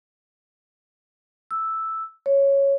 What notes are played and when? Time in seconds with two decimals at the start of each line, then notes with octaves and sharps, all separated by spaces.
1.51 E6
2.26 C#5